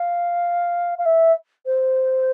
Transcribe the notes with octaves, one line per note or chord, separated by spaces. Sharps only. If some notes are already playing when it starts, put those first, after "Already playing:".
Already playing: F5
F5
E5
C5